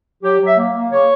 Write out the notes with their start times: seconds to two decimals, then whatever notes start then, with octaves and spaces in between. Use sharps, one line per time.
0.23 F#3 G4
0.40 F#3
0.45 E5
0.57 A#3
0.74 A#3
0.92 C#3 C#5